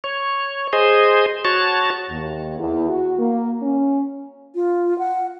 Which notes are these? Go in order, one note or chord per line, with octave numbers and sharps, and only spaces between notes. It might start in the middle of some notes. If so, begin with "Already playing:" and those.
C#5
G#4 C5 D#5
F#4 C#5 A5
D#2
E2
F#4
A#3
C#4
F4
F#5